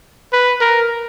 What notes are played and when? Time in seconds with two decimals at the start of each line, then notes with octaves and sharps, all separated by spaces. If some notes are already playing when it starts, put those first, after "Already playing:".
0.33 B4
0.61 A#4